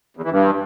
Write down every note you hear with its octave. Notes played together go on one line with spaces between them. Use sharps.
E2
E3
G2